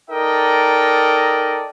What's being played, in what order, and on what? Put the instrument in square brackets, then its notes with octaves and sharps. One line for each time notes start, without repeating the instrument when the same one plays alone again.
[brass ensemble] D#4 A4 A#4 D5 D#5 G5